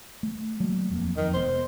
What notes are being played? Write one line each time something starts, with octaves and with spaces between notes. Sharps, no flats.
A3
F#3 A3 A#3
D#1 F2 A#3
F2 D#3
E1 B3 C5